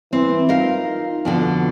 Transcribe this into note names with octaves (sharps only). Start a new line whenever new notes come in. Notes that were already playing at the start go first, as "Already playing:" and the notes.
E3 C4
D#4 F4 A#4 F5
F2 B2 D3